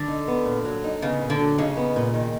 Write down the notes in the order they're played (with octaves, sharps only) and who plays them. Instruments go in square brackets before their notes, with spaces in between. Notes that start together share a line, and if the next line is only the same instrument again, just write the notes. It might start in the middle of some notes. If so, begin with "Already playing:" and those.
Already playing: [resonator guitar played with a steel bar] D3
[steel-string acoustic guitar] D#4
B3
A#2
F#3
D#4
[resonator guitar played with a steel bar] C#3 [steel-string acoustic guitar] B3
[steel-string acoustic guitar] A#2
[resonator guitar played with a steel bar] D3
[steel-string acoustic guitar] F#3
[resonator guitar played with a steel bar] C#3 [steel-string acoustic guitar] D#4
[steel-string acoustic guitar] B3
A#2
D#3